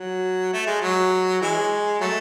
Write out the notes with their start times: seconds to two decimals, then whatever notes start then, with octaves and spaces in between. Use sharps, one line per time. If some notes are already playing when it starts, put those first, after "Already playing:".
Already playing: F#3
0.53 A3
0.67 G#3
0.82 F#3
1.41 E3 G#3
2.01 F#3 A3